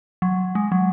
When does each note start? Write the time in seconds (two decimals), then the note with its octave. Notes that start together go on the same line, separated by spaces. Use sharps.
0.22 F#3
0.55 G#3
0.72 F#3